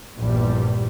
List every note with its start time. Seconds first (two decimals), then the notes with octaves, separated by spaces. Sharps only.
0.17 A#1 E2 G2 G3